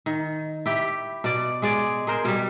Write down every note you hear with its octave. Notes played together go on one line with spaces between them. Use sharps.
D#3
E4 G4
B2 D5
G#3 G#4 D5
G#4 A#4 C5
B2 G3